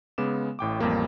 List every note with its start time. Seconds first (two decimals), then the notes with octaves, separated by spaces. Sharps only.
0.18 C#3 G#3 B3 D6 E7
0.59 A1 A2 G5 D6
0.79 A1 F2 G3 A#3 G4